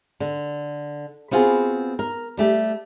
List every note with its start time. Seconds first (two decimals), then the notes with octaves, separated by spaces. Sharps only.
0.20 D3
1.31 B3 C4 F4 F#4 G#4 B4
1.99 A#4
2.37 G3 A3 G4